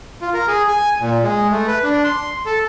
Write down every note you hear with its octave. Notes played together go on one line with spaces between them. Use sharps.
F4
A#4
G#4
G#5
A#2
G#3
A3
B4
D4
C6
A4